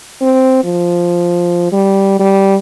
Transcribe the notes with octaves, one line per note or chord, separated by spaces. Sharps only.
C4
F3
G3
G3